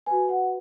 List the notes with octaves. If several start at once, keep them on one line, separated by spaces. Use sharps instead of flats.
F#4 B4 G#5
F#5